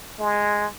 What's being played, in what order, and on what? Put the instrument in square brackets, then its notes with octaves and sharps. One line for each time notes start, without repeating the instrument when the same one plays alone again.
[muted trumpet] G#3